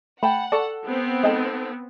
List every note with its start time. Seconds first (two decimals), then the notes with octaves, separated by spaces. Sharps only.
0.23 A3 F#5 G5 A5 B5
0.52 A4 D5 A5 C#6 A6
0.87 B3 C4
1.23 G#3 D#4 A4 D#5 G5